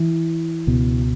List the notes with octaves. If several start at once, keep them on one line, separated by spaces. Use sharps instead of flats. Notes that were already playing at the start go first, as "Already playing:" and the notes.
Already playing: E3
C#2 B2